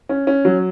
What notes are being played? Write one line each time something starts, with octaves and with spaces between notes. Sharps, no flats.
C#4
C#4
F#3